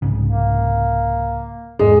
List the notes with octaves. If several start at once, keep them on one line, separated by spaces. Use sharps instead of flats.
C2 G#2 C#3
A#3
E2 G#2 G#3 D4